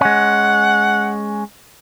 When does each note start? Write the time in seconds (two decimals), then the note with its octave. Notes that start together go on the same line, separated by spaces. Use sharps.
0.01 G#3 C#4 F#5